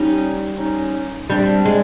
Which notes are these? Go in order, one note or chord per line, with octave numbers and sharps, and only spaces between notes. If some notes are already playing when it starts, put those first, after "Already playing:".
Already playing: G3 C#4 D#4
C#4 D#4
G3 C4 D4
G#3